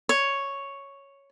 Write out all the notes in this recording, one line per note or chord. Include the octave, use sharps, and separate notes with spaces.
C#5